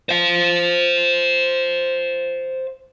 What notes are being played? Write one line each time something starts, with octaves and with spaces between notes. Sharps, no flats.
C5 F5